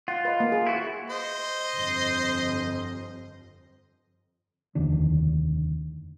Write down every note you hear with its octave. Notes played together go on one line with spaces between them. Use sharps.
F4 F#5
B4 D#5
A#3
G#4
E4 F#4
C5 D#5
G1 F2
F1 D#2 D3 D4